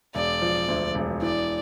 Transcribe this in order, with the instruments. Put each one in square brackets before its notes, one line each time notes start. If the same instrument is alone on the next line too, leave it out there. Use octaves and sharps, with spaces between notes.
[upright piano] E1 [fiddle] D5
[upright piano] F3
D2
E1
[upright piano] E3 [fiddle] D5